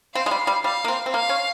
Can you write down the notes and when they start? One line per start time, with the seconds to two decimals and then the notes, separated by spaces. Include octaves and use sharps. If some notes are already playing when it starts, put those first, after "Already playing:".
0.15 C4 F5
0.26 G#3
0.31 G3
0.47 G3
0.64 G3 F5
0.84 A#3
0.88 C4
1.06 C4
1.13 A#3 F5
1.29 C#4